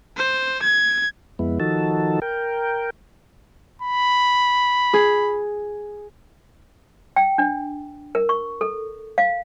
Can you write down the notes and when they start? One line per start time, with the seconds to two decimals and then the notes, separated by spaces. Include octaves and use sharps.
0.17 C5
0.62 G#6
1.39 F2 G#3 B3 E4
1.60 D#3 F3 D#4 F#4 A4 A5
2.22 A#4 G5
3.82 B5
4.93 G#4
7.16 G5
7.38 D4
8.15 A#4
8.29 C#6
8.61 A4
9.18 F5